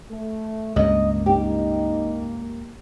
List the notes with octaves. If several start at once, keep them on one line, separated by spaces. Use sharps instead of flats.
A3
C#2 G2 A#3 D#5
D#4 G4